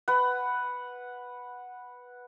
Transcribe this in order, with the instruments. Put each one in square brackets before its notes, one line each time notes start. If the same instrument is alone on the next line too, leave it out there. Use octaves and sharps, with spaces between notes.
[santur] B4 F#5